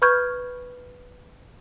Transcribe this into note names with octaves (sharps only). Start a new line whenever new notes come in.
B4 B5 C#6 F6 G6 G#6